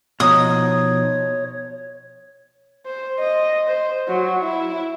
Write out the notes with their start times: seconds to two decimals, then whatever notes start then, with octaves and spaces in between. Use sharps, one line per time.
0.20 B2 F3 D#4 C#5 D#6
2.86 C5
3.19 D#5
3.68 C5
4.08 F#3
4.42 E4